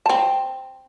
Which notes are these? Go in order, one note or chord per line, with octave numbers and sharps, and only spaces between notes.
C4 A5